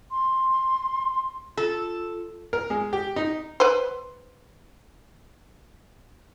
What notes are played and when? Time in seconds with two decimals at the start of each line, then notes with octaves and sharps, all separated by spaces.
0.11 C6
1.57 F4 A4
2.53 A#4
2.70 G#3
2.93 G4
3.16 D#4
3.60 B4 C5